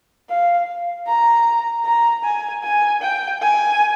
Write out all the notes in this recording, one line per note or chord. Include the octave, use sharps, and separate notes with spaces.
F5
A#5
A#5
G#5
G#5
G5
G#5